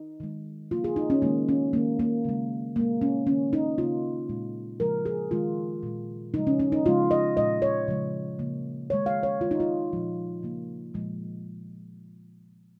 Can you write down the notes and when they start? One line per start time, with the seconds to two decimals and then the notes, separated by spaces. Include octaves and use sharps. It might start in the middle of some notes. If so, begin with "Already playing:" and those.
Already playing: D#4
0.20 D#3 G#3
0.71 C#3 A#3 F4
0.84 G#4
0.96 D#4
1.10 C#4
1.22 D#3 G#3 A#3
1.49 C#4
1.73 D#3 G#3 A#3
1.99 A#3
2.25 C#3 G#3
2.76 A#2 G#3 A#3
3.01 C#4
3.27 D#3 A#3 C#4
3.53 D#4
3.78 C#3 A#3 F4
4.29 A#2 G#3
4.80 C#3 F3 G#3 A#4
5.05 G#4
5.31 D#3 G#3 F4
5.83 A#2 G#3
6.34 C#3 F3 G#3 D#4
6.47 C#4
6.60 C#4
6.72 D#4
6.85 C#3 F3 G#3 F4
7.11 D#5
7.37 A#2 G#3 D#5
7.62 C#5
7.88 C#3 F3 G#3
8.39 C#3 A#3
8.90 D#3 G#3 C#5
9.06 F5
9.23 C#5
9.40 D#3 G#3 F4
9.51 D#4
9.60 F4
9.92 A#2 F3 G#3
10.43 C#3 A#3
10.94 A#2 F3 G#3